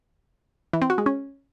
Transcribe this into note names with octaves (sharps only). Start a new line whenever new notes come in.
E3
C4
F#4
G#3
C#4